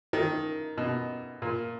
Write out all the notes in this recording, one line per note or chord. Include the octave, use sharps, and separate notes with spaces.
D#3
B2
A#2